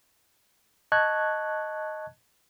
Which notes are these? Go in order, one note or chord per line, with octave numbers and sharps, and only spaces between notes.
D#5 A5 C#6 F#6 G#6